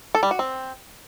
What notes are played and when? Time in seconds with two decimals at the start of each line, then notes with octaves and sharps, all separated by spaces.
0.15 A4
0.23 G3
0.31 F#4
0.39 C4